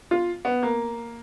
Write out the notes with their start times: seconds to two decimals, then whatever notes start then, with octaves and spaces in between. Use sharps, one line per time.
0.11 F4
0.45 B3
0.63 A#3